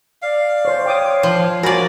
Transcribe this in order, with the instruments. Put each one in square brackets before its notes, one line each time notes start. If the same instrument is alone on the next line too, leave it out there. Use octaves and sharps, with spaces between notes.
[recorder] D5 [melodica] F5
[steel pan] C5 C#5
[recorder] C#5 [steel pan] G5 D6 D#6
[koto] F3
[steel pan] F#4 G#5 B5 [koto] A#4 D5